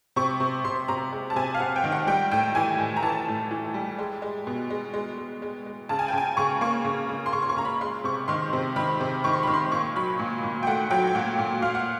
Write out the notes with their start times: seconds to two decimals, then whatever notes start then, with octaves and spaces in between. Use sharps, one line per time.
0.16 C3 C#6
0.40 C3
0.64 C3 C6
0.88 C3 A#5
1.12 G#3
1.30 A5
1.36 C3 G#5
1.55 F5
1.59 C3 F#5
1.76 G5
1.84 D#3
1.92 F#5
2.07 G3 G5
2.31 A2 G5
2.55 E3 G#5
2.79 A2
2.96 A#5
3.03 E3 A5
3.28 A2
3.51 E3
3.74 G3
3.98 G#3
4.22 G#3
4.47 B2
4.70 G#3
4.94 G#3
5.18 G#3
5.42 G#3
5.66 G#3
5.89 C#3 A5
5.99 G#5
6.08 G5
6.13 C#3 G#5
6.37 C#3 C#6
6.61 A#3 C#6
6.85 C#3
7.09 C#3
7.26 C6
7.33 C#3 C#6
7.42 C6
7.49 C#6
7.56 C#3 A#5
7.65 B5
7.81 G#3 C6
8.04 C3 C#6
8.28 D#3 C6
8.53 C3
8.76 D#3 B5
9.00 C3
9.24 D#3 C#6
9.33 C6
9.43 D#3 B5
9.54 C6
9.71 A#2 C#6
9.95 F#3 B5
10.19 A#2
10.43 A#2
10.63 G5
10.67 A3 F#5
10.90 F#3 G5
11.07 G5
11.15 A#2 F#5
11.39 A#2
11.62 A#2 F5
11.75 F#5